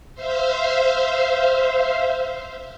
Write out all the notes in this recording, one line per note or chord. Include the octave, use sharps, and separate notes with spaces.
C5 E5 F5